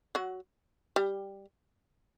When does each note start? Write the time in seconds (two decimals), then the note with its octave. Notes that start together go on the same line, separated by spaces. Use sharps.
0.15 F#3 F#4
0.96 G3 G4